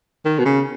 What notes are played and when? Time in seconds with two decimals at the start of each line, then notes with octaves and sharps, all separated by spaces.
0.25 D#3
0.39 B2
0.45 C#3